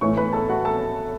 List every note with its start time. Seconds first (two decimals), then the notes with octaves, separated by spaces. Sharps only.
0.01 A2 E3 A3 C#5 C#6
0.17 B4 B5
0.33 A4 A5
0.49 F#4 F#5
0.65 A4 A5